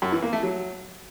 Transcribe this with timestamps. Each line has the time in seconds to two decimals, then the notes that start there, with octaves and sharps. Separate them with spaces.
0.02 F#2
0.12 E3
0.23 A#3
0.33 A3
0.43 F#3